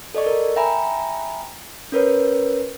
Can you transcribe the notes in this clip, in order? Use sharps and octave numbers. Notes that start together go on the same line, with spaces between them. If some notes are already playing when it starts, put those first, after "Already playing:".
A4 D5 D#5 C#6
A#4
E5 G5 G#5 A#5 B5
C#4 A#4 B4 C#5